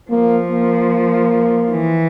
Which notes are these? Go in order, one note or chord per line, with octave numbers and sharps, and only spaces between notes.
F3 A#3
A#3
E3